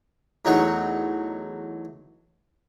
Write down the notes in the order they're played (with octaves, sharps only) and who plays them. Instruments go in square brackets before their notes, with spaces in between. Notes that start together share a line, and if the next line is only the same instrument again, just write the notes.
[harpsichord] E2 F#3 A3 D#4 F#4 F#5